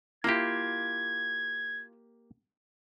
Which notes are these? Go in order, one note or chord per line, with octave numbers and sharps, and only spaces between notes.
A#3 E4 F4 G4 G#6